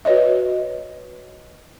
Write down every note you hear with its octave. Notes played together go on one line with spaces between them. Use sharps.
F#4 B4 C#5 D#5 E5